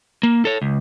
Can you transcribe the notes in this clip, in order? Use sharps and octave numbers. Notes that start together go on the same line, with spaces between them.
A#3
A4 C#5
C#2